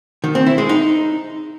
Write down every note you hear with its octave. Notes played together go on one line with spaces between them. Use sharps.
D#3
C4
E4
G#3
D#4